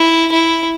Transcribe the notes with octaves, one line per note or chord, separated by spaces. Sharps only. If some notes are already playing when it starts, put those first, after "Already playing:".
Already playing: E4
E4